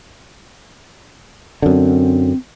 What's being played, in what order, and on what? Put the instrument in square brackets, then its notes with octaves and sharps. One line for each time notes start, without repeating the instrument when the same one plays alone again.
[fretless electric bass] F#2 D3 [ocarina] C4